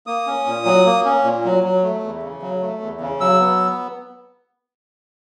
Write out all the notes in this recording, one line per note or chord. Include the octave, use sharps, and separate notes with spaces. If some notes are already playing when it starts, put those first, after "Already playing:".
A#3 D#6
C#4
A#2
F#3
A#3
C#4
A#2
F#3
F#3
A3
E2
C#3
F#3
A3
E2
C#3
F#3 E6
B3